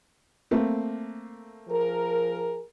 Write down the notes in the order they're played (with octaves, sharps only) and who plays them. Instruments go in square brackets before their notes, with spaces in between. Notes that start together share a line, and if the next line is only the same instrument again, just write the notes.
[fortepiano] A3 A#3 C4
[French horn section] F3 G#4 A#4